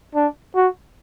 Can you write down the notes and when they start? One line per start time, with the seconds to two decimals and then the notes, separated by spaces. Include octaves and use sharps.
0.15 D4
0.56 F#4